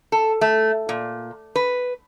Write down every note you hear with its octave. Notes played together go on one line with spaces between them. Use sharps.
A4
A3
A#2
B4